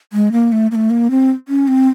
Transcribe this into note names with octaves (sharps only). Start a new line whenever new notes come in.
G#3
A#3
A3
A#3
A3
A#3
C4
C#4
C4